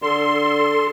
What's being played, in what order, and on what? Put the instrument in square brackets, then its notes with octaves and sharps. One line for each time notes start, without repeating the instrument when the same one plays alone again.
[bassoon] D3 [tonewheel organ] A4 [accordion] C6